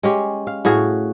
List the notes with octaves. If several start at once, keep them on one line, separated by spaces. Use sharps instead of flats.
G#3 C#4 G4
F5
A2 F#4 G#4 F5